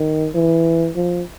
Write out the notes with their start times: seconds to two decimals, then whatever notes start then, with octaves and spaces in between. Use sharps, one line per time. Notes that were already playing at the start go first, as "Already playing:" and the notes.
Already playing: D#3
0.35 E3
0.96 F3